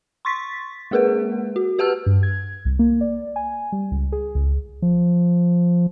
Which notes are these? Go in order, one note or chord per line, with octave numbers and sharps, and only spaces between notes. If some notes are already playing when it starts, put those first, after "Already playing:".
C6 C#6 A6 B6
G#3 A#3 G#4 A#4 B4 F#5
F#4
G4 B4 F#5 A5 E6 F6
G2
G#6
C2
A#3
D5
G#5
G3
C#2
G#4
C#2
F3